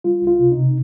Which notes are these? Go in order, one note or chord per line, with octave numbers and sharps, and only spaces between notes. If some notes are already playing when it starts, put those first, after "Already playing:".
G3 F4
C#2
F4
C3
D#4
C3